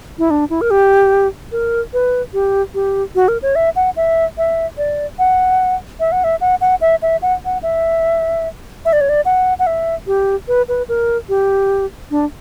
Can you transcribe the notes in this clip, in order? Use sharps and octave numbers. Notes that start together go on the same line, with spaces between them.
E4
D4
E4
A#4
G4
A#4
B4
G4
G4
F#4
A#4
C#5
E5
F#5
E5
E5
D5
F#5
E5
F#5
E5
F#5
F#5
E5
E5
F#5
F#5
E5
E5
D5
C#5
D5
F#5
F#5
E5
G4
B4
B4
A#4
G4
D4